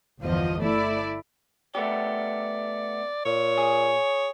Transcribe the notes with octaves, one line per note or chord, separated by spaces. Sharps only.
G1 E2 F3 D#5
A3 E4 D5
A3 B3 G4 D5
A#2 C#5
G#4